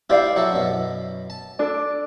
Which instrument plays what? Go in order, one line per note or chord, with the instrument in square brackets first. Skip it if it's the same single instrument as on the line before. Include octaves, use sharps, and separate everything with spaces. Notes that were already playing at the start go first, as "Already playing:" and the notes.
[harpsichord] E4 F4 G4 [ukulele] C5 D5 F5
[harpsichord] F#3 E4 A4 [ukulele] F#5
[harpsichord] F#2 B2
A5
[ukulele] D4 A4 D5